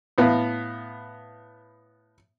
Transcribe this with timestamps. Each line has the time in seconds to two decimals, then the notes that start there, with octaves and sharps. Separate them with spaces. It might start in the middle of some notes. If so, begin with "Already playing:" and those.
0.18 A2 B3 F5